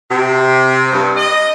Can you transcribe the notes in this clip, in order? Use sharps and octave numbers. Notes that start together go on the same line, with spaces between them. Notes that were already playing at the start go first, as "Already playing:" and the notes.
C3
G2
D#5